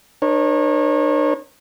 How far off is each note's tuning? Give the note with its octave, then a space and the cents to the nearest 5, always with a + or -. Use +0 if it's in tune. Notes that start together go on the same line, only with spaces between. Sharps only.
D4 +45 A#4 +45 C#5 -30